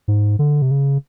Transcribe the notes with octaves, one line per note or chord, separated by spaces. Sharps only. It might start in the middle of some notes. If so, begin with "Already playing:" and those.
G#2
D3
C3
C#3